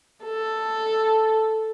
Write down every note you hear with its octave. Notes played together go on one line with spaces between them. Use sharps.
A4